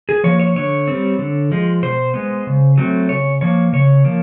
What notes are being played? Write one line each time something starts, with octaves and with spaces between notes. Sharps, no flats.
G#4
F3 A#3 C#5
C#5
D3 C#5
G3 C4
D3
F3 G#3
B2 C5
G#3 B3
C#3
F#3 A3 C4
C#3 C#5
F3 A#3 C#5
C#3 C#5
F3 A#3